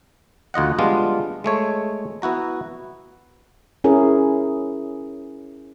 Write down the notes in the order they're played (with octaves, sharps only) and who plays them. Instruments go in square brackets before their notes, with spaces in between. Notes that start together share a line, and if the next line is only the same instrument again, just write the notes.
[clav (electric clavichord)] D2 F4 D#5 F#5
G3 G#3 B3 D4 F4
G#3 A3 C#5
B3 E4 F#4 A#5
[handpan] C#4 E4 G#4 A#4